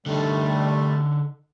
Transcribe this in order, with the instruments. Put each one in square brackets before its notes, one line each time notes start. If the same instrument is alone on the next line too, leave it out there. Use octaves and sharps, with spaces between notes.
[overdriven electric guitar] D3 D#4 [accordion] G3 A3